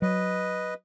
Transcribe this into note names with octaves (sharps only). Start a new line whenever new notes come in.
F#3 B4 D#5